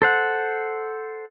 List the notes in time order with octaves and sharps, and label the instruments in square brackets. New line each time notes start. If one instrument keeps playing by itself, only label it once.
[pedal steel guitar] A4 C5 F#5